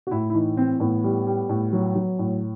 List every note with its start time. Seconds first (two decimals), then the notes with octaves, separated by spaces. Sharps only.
0.07 F#4
0.11 A2 E4
0.30 E4
0.35 E3 D#4
0.57 E3 C4
0.80 A2 B3
1.04 G3
1.27 G3
1.49 A2
1.73 F#3
1.95 F#3
2.19 A2